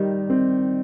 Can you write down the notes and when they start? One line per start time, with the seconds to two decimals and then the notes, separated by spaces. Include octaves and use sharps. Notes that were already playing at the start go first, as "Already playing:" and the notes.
Already playing: D#3 G3 G4
0.30 C4